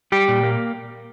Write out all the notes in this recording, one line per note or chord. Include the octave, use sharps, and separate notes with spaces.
G3 G4
A#2
A#3